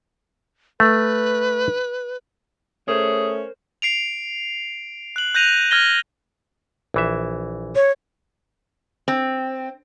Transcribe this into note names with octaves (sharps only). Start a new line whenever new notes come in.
A3 B4
A3 C#4 G#4 A#4 C5 C#5
C7 D7 F7
F#6 F#7
F#6 G6 A#6 D#7 F7
F6 G#6 A#6 G7
A#1 E3 E5
C#5
C4